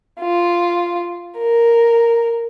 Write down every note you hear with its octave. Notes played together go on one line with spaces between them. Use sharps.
F4
A#4